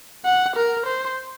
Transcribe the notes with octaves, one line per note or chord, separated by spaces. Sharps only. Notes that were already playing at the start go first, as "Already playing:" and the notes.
F#5
A#4
C5